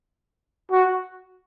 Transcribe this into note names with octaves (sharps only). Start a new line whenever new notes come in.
F#4